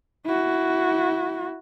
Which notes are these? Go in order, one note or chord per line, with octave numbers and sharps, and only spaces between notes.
E4 F#4